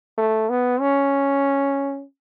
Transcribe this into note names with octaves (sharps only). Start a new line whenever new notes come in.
A3
B3
C#4